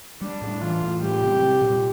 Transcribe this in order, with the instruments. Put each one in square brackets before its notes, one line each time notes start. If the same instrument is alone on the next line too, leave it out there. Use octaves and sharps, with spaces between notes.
[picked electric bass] G3 [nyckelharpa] D4
[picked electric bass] A2
[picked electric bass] E3 [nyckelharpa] F4
[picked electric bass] A2
[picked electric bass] G3 [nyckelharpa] G4
[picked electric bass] C3
G3
A#2